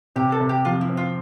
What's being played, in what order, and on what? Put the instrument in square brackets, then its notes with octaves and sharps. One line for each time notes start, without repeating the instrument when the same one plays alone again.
[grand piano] C3 [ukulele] G4
[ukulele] A4
[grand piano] C3
[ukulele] G4
[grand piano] F3 [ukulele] F4
[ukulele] E4
[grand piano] C4
[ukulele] F4